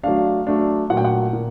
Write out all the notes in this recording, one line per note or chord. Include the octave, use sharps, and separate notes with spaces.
F#3 A3 D4 F5
F#3 A3 D4
A#2 F#3 A3 F#5
G5
F#5
A#2